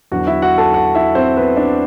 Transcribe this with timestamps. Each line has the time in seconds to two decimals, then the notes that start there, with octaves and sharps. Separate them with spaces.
0.12 E2 D3 F#3 F#4 F#5
0.27 E4 E5
0.42 F#4 F#5
0.58 A4 A5
0.74 F#4 F#5
0.95 E4 E5
1.15 C4 C5
1.36 B3 B4
1.57 D4 D5